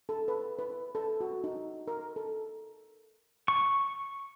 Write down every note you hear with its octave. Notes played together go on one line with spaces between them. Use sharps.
A4
B4
B4
A4
F#4
D#4
A#4
A4
C#6